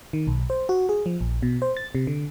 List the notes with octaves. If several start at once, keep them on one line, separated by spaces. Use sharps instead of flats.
D#3
B1
C5
F#4
G#4
F3
A#1
B2
C5
A6
C3
D3